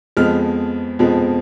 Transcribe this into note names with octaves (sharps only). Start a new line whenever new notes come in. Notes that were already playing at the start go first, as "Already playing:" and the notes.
F2 F3 G#3 B3 F6
F2 F3 G#3 B3